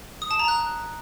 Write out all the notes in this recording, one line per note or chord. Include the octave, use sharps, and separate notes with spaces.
D#6
A5
A#5
F#6